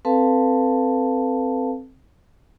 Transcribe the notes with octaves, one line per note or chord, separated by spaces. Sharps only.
C4 A4 B4 F5 A5